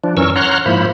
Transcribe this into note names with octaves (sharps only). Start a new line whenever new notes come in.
F3 D4
F#2 E3 C#4 A#4 C#6 E6
C#5 F#5 A#5 C6 F6 F#6
G#2 F3 A#3 E4 C5 B5